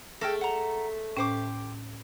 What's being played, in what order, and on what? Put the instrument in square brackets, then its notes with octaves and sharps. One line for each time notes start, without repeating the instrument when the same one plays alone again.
[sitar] A3 [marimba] G#4 F6 A#6 [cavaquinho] A4 G5
[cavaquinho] F#5 A#5
[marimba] A2 C#4 [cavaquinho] G4 C5 D6